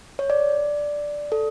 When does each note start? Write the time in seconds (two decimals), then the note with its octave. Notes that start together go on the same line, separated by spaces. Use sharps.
0.19 C#5
0.30 D5
1.32 A4